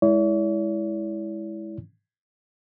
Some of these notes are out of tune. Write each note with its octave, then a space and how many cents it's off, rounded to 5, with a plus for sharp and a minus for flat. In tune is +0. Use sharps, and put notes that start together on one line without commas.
G#3 +0 E4 -5 C#5 +45